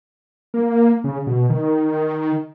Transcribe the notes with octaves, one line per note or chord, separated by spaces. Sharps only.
A#3
C#3
B2
D#3